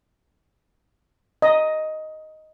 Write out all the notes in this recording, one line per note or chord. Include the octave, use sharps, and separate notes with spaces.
D#5